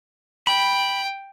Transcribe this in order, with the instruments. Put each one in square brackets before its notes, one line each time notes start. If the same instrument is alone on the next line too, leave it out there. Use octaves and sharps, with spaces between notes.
[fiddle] G5 [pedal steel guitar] B5